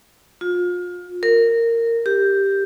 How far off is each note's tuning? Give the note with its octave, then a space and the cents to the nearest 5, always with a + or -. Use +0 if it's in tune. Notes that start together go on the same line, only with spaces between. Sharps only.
F4 +30
A#4 -15
G4 +5